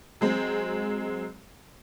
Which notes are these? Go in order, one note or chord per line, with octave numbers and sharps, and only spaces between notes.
F#3 G#3 C4